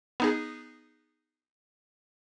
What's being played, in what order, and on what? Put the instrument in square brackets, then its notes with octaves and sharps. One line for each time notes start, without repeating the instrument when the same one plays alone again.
[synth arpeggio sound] B3 D#4 G#4